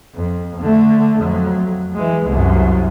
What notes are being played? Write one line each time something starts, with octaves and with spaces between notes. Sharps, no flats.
F2
D3 A3
F2 F#3
E3 G#3
C2 F#2